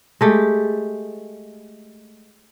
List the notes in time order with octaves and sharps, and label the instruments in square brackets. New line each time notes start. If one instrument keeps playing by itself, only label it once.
[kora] G#3 A3 G4